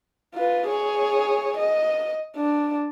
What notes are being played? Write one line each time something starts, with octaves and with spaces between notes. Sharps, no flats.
F4 B4
G#4 C#5
D#5
D4